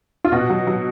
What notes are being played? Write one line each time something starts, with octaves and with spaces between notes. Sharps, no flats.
F4
B2 F#4
F#3
F#3